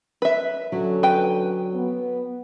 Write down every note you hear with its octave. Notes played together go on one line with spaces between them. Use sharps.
B4 E5
D3 F#3 C#4 A4
B4 G5
B3